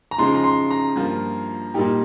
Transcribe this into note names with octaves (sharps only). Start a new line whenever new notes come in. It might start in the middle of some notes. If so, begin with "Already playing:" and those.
A#5
C#3 F3 G#3 D#4 C6
A#5
C6
A#5
G2 F3 A#3 F4
A#2 G3 A#3 D#4 G4